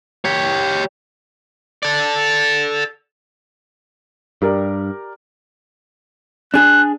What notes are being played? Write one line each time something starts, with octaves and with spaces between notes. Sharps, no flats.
G4 C#5
A4 D5
G2 G4 A#4 D5
D4 G#4 F#6